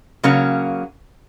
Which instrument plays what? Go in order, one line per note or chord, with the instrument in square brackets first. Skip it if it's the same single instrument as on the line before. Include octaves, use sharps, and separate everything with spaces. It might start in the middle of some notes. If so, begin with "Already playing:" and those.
[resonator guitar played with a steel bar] C#3 F#3 A#3 C#4